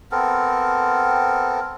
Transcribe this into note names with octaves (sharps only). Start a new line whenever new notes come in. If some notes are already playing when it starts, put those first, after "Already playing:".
B3 C4 A4 A#4